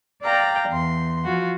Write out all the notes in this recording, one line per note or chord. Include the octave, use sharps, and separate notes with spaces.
D5 F5 G5 A#5
E2 C6
F3 F4 F#4